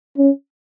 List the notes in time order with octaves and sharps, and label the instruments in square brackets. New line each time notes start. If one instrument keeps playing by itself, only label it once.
[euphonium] C#4